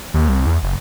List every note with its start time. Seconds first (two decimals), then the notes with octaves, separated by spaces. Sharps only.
0.14 D#2
0.29 C2
0.46 E2
0.63 F#1